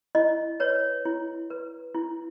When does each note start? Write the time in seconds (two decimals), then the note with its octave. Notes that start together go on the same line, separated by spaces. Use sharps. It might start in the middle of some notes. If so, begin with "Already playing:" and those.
0.15 E4 D#5
0.60 B4 C#5
1.05 E4
1.50 B4
1.94 E4